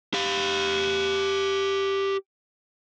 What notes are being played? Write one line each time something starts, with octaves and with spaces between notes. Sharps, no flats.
G4 F5